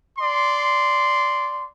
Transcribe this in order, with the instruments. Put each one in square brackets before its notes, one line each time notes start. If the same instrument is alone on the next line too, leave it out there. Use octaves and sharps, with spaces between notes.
[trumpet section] D5 C6